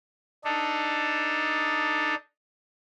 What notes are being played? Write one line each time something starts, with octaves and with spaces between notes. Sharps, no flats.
D4 D#4 A4